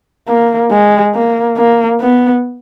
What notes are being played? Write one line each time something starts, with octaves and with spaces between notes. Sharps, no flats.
A#3
G#3
A#3
A#3
B3